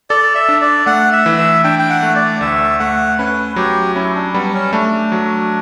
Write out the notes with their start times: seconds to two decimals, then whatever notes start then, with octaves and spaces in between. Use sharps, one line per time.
0.10 A4 D5
0.35 E5
0.49 D4
0.61 D5
0.86 A3 F#5
1.12 E5
1.26 E3
1.38 E5
1.64 D4 G5
1.79 G5
1.90 F#5
2.03 A3
2.16 D5
2.41 D2 E5
2.80 A3 F#5
3.18 C#4 B4
3.56 F#3 G4
3.95 C#4 E4
4.15 D4
4.34 G3 B3
4.54 C#4
4.73 A3 D4
5.12 F#3